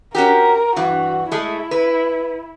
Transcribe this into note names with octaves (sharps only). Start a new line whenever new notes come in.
C#4 F#4 G4 A#4
G2 E3 F#4
G#3 A3 E4
B4